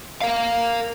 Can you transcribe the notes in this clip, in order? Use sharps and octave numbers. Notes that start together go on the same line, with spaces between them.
A#4 F5